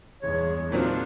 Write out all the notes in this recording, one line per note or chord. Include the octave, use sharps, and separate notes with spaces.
E2 G2 G#3 C#5
A#2 F#3 C4 D4 D#4 F4